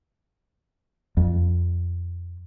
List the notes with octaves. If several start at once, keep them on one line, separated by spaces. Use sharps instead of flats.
F2